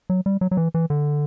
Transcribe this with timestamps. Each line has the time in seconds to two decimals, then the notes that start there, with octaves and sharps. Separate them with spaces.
0.10 F#3
0.26 G3
0.41 F#3
0.51 F#3
0.57 E3
0.74 E3
0.90 D3